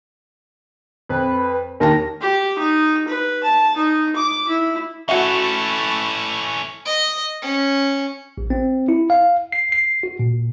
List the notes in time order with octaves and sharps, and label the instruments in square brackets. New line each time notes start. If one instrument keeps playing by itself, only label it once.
[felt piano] F2 [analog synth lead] B4
[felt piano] D#2 A5 A#6 [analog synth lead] A#4
[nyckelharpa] G4
D#4
B4
A5
D#4
D6
E4
[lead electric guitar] E3 C#4 [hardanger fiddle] A3 E4 [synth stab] F#4 C#7 [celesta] E5
[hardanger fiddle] D#5
C#4
[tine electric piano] A1
C4
E4
F5
C7
C7
F#4
A#2